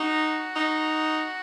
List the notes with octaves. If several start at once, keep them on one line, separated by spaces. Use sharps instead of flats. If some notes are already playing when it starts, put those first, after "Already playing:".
Already playing: D#4 F#4
D#4